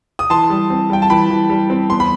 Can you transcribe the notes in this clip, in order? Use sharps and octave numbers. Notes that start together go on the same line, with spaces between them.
D#6
E3 A5 C6
G3
C4
G3 G5
A5
E3 G5 B5
E3
G3
C4
E2 C6
B5